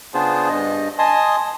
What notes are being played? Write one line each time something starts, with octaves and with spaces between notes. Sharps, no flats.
C#3 B3 D4 F4 G#4 C5
G2 D#5
D#5 G#5 A5 C6 D#6